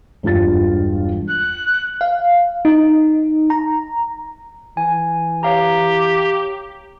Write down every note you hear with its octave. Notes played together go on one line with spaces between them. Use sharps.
E1 G2 F4 A6
F#6
F5
D#4
A#5
E3 G#5
G4 C#5 F5 A#5